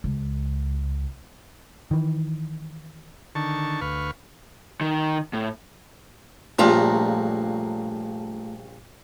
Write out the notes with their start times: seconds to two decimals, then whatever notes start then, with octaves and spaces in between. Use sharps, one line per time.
0.04 C#2
1.91 D#3 E3
3.35 D3 D#3 A5 C#6
3.81 D2 B4 F5 C#6
4.81 D#3
5.33 A2
6.59 A#1 G2 C#3 A3 F4 A#5